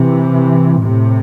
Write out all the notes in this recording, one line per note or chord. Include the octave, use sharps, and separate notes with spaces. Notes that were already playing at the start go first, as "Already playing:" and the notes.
Already playing: C3 E3
A2 C3